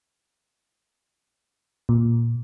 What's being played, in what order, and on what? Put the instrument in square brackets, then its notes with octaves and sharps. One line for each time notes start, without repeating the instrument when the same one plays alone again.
[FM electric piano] A#2